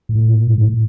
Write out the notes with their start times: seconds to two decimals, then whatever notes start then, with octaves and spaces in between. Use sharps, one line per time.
0.09 A2
0.28 A#2
0.47 G#2
0.58 A2